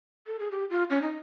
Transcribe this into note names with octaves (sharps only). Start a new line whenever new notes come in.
A4
G#4
G4
F4
C#4
D#4